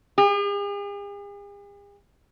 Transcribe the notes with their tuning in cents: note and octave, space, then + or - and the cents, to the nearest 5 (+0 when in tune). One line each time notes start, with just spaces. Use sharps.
G#4 -45